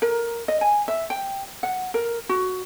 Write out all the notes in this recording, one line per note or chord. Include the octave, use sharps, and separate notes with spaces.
A#4
D#5
G#5
E5
G5
F#5
A#4
F#4